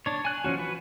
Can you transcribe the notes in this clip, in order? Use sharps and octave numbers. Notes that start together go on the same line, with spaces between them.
D4 C#5
G#5 F#6
F3 A3 C#4 F#4
B4